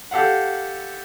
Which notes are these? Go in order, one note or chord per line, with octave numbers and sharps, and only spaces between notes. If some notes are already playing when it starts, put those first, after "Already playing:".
G4 A4 F5 F#5